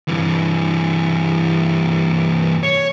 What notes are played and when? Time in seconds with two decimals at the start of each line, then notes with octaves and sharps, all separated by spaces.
0.08 G2 E3
2.63 C#5